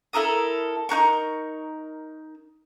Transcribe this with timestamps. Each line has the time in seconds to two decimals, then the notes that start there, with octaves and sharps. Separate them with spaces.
0.13 E4 A4 A#4 D#6
0.89 D#4 F#4 A#4 C#6